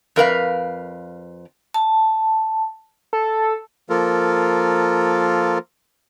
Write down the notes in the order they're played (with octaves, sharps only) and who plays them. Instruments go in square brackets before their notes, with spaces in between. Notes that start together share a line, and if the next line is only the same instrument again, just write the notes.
[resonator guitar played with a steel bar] F2 A#4 B4 F5
[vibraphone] A5
[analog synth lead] A4
[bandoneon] F3 A#3 F4 A4 A#4